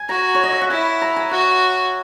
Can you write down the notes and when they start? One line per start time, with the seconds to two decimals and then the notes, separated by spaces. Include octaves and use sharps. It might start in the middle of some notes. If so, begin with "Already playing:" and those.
Already playing: G#5
0.09 F#4 A#5
0.35 C#5
0.43 D#5
0.52 E5
0.62 F#5
0.70 E4 G#5
1.02 A#5
1.16 G#5
1.31 F#4 F#5